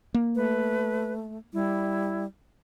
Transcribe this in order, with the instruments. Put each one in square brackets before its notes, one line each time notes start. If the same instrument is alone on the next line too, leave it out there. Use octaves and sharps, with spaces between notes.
[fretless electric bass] A#3
[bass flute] A3 [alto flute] B4
[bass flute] G3 [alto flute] E4